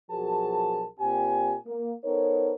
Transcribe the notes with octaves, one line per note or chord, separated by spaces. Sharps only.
B1 F3 F#4 G#4 A#4 A5
A#2 C4 G4 G#5
A#3
B3 D#4 A4 A#4 C5 C#5